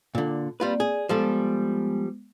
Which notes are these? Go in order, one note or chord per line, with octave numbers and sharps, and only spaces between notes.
A#2 D3
G3 A#3 C4 F4 B4 D5
G#4 D5
F3 G3 G#3 B3 A4